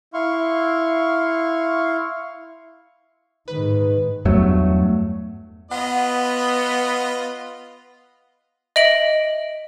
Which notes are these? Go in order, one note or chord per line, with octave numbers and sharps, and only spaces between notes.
E4 F5 C6 C#6
G#2 D#3 B4
E2 G2 F#3 A3
B3 F4 B4 D#5 F#5
D#5 E5 D7 F#7